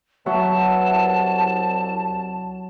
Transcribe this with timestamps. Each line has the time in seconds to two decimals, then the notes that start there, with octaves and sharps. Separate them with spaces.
0.26 F#3 B3 E5 A5
0.91 C2